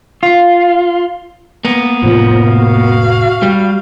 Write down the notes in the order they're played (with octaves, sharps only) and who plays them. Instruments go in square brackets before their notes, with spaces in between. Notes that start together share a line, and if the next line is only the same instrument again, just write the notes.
[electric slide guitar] F4
[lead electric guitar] A#3 B3
[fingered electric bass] F1 A2 D#3 [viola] F3
[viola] F#4 F5
[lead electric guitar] G3